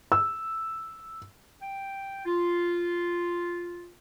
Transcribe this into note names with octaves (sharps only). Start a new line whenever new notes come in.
E6
G5
F4